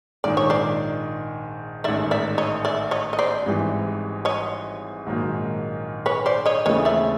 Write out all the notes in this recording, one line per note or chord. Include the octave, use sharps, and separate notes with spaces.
A#1 G#2 D#3 D5
C#5
C5 D5
A1 G#2 D#3 D5 E5
D5 E5
C#5 D#5
D5 E5
C#5 D#5
D#5
C5 D5
G#1 G#2 E3 G3
C#5 D#5
A#1 G#2 D#3 F#3 A#3
B4 C#5
C5 D5
C#5 D#5
D#2 C#3 E3 A3 C4 C#5 D#5
D5 E5